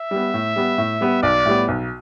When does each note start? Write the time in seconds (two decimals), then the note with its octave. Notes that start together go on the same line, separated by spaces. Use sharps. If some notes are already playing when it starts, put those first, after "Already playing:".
Already playing: E5
0.11 G3 B3
0.34 A2
0.56 G3 B3
0.78 A2
1.01 G3 B3
1.23 B1 D5
1.45 A2 G3 B3
1.68 B1